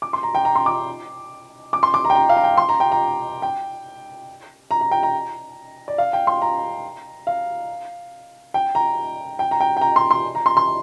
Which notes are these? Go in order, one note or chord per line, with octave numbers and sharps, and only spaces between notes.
D6
C6
A#5
G5
A#5
C6
D6
D6
C6
D6
A#5
G5
A#5
F5
A#5
G5
C6
A#5
G5
A#5
G5
A#5
A#5
G5
A#5
D5
F5
G5
C6
A#5
F5
G5
A#5
G5
A#5
G5
G5
A#5
C6
C6
A#5
C6
C6